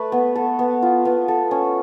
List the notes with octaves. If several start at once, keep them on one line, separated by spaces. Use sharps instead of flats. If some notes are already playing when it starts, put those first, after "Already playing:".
Already playing: A3 B4
B3
A4
B3
F4
B3
A4
C#4